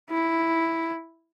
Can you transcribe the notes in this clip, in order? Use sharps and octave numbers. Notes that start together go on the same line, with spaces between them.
E4